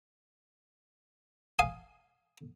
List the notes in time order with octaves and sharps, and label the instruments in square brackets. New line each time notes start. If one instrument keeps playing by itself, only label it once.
[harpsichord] F5 G#5 D#6